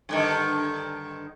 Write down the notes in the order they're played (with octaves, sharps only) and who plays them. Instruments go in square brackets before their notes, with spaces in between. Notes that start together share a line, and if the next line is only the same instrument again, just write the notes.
[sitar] G2 D3 D#3